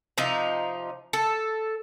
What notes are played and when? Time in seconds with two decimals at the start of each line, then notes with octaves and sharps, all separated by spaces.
0.18 C3 F3 D#4
1.13 A4